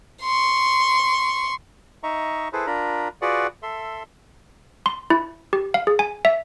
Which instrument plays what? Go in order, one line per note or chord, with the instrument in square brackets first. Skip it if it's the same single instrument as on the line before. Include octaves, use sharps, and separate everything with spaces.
[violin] C6 C#6
[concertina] D#4 D#5 E5 A#5 C#6
E4 G#4 A4 B4 C5
D4 F4 A#4 A#5 B5
F4 F#4 G#4 B4 D5 F#5
A4 E5 C6
[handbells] C6
E4
G4
F5
G#4
G#5
E5